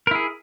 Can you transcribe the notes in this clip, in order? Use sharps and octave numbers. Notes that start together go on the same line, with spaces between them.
E4 G#4 A#4